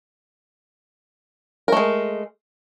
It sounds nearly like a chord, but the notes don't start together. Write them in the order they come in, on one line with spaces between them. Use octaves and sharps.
A#4 A3 G#3